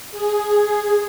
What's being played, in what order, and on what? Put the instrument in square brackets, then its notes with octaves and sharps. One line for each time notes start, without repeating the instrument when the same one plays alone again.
[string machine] G#4